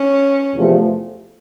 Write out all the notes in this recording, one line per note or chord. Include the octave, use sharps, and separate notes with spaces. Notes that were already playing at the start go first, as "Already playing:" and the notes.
Already playing: C#4
E2 C3 F3 A3